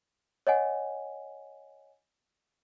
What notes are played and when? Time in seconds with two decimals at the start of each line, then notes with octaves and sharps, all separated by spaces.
0.47 C#5 D#5 F#5 G#5